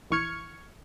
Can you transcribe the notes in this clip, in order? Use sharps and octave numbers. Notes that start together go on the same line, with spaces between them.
A#1 E3 C#6 F6 G#6 C#7